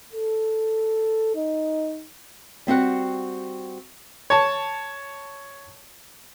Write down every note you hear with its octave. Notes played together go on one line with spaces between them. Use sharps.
A4
D#4
G3 C4 F#4 F#5
C#5 A5